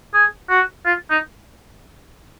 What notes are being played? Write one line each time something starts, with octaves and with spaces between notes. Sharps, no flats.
G#4
F#4
F4
D#4